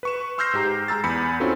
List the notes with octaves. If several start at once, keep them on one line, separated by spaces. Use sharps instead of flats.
B4 C#6 E7
C6 E6 F6 G6 A#6 C7
G#2 G4 A#5
G#3 A#5 E6 A6
E2 B5 C#7
C4 C#4 D#4 F4 F#4 A4